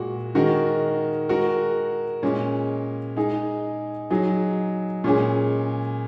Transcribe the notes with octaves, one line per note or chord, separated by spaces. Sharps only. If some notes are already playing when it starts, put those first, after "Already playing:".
Already playing: A#2 G#3 F#4
D#3 G#3 F#4 A#4
G#3 F#4 A#4
A#2 G#3 C#4
G#3 D#4 G#4
F#3 D#4 G#4
A#2 G#3 C#4 G#4